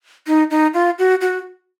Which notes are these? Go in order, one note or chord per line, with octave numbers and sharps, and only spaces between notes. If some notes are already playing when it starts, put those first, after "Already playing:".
D#4
D#4
F4
F#4
F#4